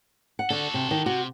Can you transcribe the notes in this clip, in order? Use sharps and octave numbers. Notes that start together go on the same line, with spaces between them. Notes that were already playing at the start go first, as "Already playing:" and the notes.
F#5
D3 F#4 A4
C3
D#3
C3 F#4